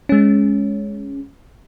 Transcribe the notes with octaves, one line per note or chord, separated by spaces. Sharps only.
G#3 C#4